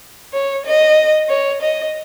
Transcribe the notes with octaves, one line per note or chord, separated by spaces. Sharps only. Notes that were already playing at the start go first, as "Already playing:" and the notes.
C#5
D#5
C#5
D#5